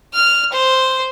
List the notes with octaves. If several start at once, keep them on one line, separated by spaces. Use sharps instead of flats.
F6
C5